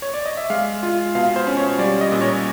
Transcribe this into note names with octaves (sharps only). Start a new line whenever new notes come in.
C#5
D5
D#5
E5
G#3 F5
F4
B2 F5
C5
C#4
C#5
G3 D5
D#5
A#2
C#5